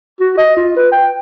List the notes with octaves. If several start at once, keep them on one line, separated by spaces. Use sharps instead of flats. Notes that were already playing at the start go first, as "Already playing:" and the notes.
F#4
D#5
F4
B4
G5